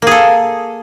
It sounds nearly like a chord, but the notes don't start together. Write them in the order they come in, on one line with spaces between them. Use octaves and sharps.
A#3 G#4 A4